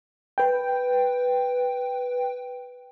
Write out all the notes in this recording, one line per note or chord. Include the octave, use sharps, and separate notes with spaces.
B4 G5